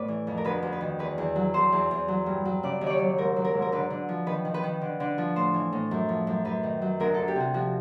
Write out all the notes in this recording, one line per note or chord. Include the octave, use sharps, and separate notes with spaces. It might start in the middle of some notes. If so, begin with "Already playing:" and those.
Already playing: A2 B4 D5
E3
F2
A#4
D2 B4
D2
B4
D#3
E2 B4
E2
F#3
E2 C5
E2
E2
F#3
G2
F#3
C#3 D5
D#2
C#5 D5
F#3
G#2 A#4
F#3
A#4
G#2
A#4
D3 B4
D3
F3
D#3 B4
D#3
B4
D#3
D3
D3
F3
A2 C5
E3
A2
F#2
F3
F#2
F#2 B4
D#3
F#3
D2 A#4
D2 A4
G4
C3 F#4
F3 F#4